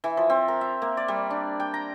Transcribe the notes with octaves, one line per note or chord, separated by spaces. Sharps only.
E3
F3
C4
A#4
E5
A#3
D5
G3
D4
G5
A#5